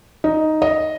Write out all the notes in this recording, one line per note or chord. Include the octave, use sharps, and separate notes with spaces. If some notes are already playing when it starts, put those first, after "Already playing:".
D#4
D#5